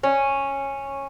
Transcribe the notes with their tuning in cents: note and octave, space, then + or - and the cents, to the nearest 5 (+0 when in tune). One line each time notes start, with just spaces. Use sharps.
C#4 -10